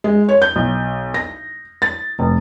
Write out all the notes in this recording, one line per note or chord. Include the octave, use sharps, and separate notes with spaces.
G#3
C#5
G6
B1
A#6
A6
F1